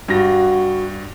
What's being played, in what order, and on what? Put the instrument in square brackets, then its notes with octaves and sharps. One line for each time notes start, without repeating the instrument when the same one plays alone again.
[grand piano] G2 A#6 [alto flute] F#4